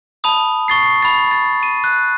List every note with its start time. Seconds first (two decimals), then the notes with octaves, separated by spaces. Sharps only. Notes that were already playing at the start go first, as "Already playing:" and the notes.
0.24 A5 B5 D#6
0.68 C#6 A6 C7
1.02 B5 A6
1.31 A6
1.63 D#7
1.84 F#6